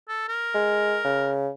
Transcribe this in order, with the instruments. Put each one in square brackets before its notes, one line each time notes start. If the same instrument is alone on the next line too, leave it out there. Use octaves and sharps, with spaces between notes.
[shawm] A4
A#4
[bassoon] G#3
C#3